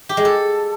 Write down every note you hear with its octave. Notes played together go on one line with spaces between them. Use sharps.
G4
G#3
A4